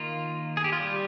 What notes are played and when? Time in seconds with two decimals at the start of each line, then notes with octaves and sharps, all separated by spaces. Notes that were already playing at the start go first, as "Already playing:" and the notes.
Already playing: D#3 A#3 F4
0.57 G#4
0.64 G4
0.72 F4
0.80 G3 G4